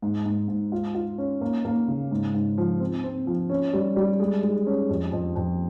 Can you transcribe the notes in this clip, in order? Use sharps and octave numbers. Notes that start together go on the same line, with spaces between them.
G#2
G#2
G#2
F4
F4
C#4
A#3
A#3
C#3
G#2
G#2
F3
C4
C4
F3
C#4
G3
G3
G#3
G#3
C#4
F2
F2
F2